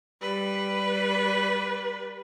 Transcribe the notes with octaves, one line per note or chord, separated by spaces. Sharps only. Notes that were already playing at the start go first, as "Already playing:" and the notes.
G3 B4